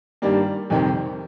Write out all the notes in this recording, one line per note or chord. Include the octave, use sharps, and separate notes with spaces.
G2 D#3 G3 A#3 D5
F2 C3 D#3 G3 C4